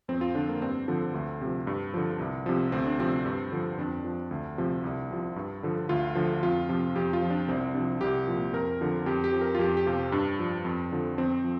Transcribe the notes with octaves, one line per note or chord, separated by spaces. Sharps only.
F2 C4
F4
D3 F3 D4
A#3
G2 C4
D3 F3
D2
C3 F3
G2
D3 F3
C2
C3 F3
D2 C4
D4
C3 F3 C4
G2
D3 F3
F2 D4
F3
D2
C3 F3
C2
C3 F3
G2
D3 F3
D2 F4
D3 F3
F2 F4
C3 F3
F2 G4
F4
F3
D4
C2 C4
C3 F3 D4
C2 G4
A#2 F3
F2 A#4
D3 F3
F2 G4
G4
F3
A#4
F4
F2 G4
G4
C3 F3 F4
G2 D4
F3
F2
D3 F3
F2 C4
F3